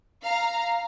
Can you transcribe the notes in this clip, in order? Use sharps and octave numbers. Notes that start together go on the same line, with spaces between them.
F5 A#5